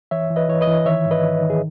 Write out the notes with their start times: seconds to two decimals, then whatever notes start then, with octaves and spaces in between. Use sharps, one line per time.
0.11 E3 C#5 E5
0.30 E3
0.36 B4 D#5
0.48 E3 C#5
0.61 B4 D#5
0.68 E3
0.86 D#3 C#5 E5
1.05 G#2
1.11 B4 D#5
1.23 D#3
1.42 D#3
1.50 G#4